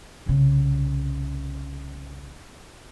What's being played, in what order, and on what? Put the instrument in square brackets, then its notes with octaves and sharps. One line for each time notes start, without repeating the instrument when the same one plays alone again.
[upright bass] C2 C#3